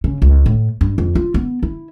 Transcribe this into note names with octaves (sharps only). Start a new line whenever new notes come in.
C#3
C#2
A2
G2
F2
F4
B3
E4